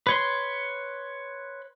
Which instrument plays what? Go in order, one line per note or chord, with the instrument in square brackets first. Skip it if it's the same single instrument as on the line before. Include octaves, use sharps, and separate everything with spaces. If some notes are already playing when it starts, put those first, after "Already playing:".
[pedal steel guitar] B4 C#5 C6